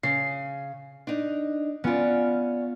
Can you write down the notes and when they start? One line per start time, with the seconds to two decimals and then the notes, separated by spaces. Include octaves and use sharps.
0.03 C#3 C7
1.07 D4 D#4
1.84 B3 C#4 F4 D5